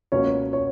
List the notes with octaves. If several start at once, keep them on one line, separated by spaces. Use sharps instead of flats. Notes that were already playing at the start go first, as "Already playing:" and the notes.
C#2 B2 A#3 C#4 C#5
C#5